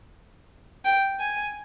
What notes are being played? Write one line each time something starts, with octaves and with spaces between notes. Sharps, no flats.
G5
G#5